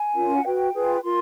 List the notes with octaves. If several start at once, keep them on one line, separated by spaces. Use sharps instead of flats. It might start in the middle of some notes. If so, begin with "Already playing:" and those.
Already playing: G#5
C#4 F4 A#4
F#5
F#4 B4 G5
F4 G#4 B4
F4 A#4 C6